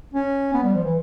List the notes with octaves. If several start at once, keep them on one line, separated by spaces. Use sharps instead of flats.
C#4
B3
G3
F3
E3